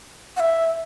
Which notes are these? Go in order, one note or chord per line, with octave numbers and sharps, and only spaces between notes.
F#5
E5